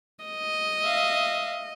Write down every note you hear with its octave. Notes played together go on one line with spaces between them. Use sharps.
D#5
E5 F5